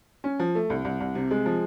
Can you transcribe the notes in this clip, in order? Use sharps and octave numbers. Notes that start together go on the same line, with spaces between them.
C#4
F3
A3
C2
C2
C2
C3
G#3
F3